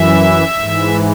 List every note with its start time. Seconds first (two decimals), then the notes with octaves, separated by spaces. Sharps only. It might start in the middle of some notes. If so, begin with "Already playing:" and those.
Already playing: F#2 E3 E5
0.59 G#2 E3